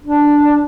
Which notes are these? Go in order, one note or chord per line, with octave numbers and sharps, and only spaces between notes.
D4